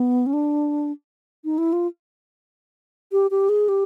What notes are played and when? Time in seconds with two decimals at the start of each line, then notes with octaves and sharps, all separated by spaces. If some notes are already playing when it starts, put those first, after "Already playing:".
Already playing: B3
0.26 C#4
0.33 D4
1.45 D#4
1.58 E4
1.73 F4
3.12 G4
3.31 G4
3.49 G#4
3.68 G4